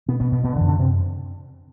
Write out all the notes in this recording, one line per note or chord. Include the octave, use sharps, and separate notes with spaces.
B2 B3
B2 B3
B2 B3
B2 B3
D3 E3
F#2
D3 D4
C3 C4